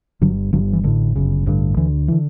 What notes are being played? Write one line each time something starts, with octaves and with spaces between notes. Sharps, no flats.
G1 G2 D3 F#3
G1 G2 D3 F#3
E3
A1 A2 D3
G1 F#2 C#3
A1 G2 D3
D2 D3 E3
D3 E3